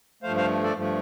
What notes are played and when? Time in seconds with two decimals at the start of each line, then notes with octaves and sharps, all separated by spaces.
0.23 G2 F3 A3 C5 F5
0.37 C5 F5
0.63 A4 D5
0.76 G2 F3 A3